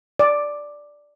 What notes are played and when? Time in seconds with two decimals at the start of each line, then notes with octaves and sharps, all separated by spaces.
0.19 D5